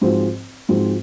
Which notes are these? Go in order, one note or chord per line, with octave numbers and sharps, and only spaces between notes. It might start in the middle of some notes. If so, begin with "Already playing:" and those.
G#2 F3 C4 F#4 C5
G#2 F3 C4 F#4 C5